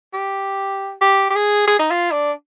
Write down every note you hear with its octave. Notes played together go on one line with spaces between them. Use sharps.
G4
G4
G4
G#4
G#4
D#4
F4
D4